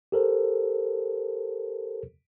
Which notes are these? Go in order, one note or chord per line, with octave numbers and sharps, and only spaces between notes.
G4 A4 A#4 C5